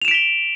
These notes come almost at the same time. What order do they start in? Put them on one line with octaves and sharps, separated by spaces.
F7 E7 D7 B6 G7